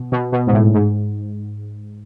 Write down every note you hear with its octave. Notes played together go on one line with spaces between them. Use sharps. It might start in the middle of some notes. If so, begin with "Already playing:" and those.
Already playing: B2
B2
B2
G#2
A2
G#2